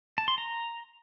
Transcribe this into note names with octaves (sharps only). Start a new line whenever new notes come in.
A5
C6
A#5